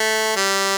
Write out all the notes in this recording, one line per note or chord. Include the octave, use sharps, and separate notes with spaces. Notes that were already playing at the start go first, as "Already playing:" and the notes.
Already playing: A3
G3